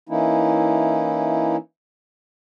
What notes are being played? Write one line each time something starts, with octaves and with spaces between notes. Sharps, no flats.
E3 A#3 C#4 D#4 E4